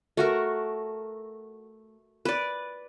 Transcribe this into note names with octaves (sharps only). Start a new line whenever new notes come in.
A3 F#4 A#4
B4 D5